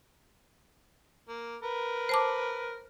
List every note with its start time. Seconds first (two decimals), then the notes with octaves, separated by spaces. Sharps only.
1.29 A#3
1.62 A#4 B4
2.09 C5 A5 D6